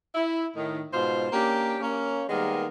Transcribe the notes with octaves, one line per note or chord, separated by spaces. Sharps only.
E4
A2 D#3
G#2 B2 F4 C5
A#3 C#4 D4 G4
A#3 C#4
D#3 G3 G#3 A#3 B3